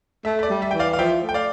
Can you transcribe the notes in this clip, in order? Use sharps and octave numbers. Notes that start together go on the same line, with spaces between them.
A3 E5
E5
D5
G3
E5
E3 G5
D5 F5
F5
F3 E5 G5
A3
G5
D5 F5